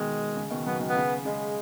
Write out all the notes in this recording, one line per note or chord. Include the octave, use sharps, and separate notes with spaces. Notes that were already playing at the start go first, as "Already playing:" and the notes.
Already playing: B2 D#3 G#3
C#3
B2 D#3
C#3 F#3 B3
B2 D#3
B3
C#3
C#3 G#3